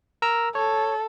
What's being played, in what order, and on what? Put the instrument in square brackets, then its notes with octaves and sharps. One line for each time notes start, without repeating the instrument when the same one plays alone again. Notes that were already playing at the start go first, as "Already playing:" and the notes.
[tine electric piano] A#4 A#5 E6
[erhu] A4 [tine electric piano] C#5